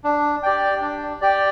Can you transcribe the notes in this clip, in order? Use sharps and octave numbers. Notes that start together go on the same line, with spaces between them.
D4
G4 D5 G5
D4
G4 D5 G5